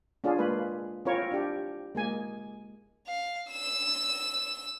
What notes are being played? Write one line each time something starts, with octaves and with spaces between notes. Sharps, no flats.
C#4 D4 F4 G#4
G#3 A#3 F4 B4
C4 C#4 E4 F4 A#4 C#5
D4 G4
G#3 A#3 G#5
F5
E6 E7